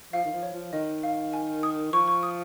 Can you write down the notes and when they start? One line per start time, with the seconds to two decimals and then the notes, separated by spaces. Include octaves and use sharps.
0.13 F3 F5
0.25 D#3
0.33 F3
0.43 C#5
0.53 F3
0.73 D#3 D#5
1.03 F5
1.33 G#5
1.63 D#6
1.93 F3 C#6
2.08 C#6
2.23 D#6